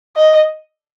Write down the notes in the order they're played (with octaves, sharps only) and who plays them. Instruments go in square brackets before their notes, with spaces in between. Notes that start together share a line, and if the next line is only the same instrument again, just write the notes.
[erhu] D#5